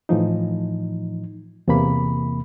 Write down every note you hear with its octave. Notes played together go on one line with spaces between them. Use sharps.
A2 E3 F3 D#4
E2 C3 E3 A#3 B5